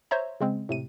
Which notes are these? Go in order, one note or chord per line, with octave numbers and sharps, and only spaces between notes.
C5 C#5 E5 A#5
C#3 G#3 C4
A2 C3 D#7